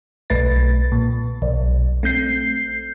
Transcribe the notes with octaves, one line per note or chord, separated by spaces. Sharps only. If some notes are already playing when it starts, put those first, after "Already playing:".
B1 A3 B4 A6
A#2
B1
A3 C4 G6 C7